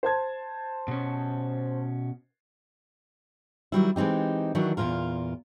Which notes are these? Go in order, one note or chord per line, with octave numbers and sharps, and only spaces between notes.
C5 A5 G#6
B2 C#4
D#3 F#3 G3 E4
E3 G#3 C4 D#4 G4
D#3 E3 F#3 D4 F#4
E2 G2 A#2 F4 A#4